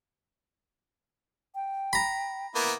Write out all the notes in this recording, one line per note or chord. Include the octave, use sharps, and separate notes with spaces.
G5
A#5 B5
A#3 B3 E4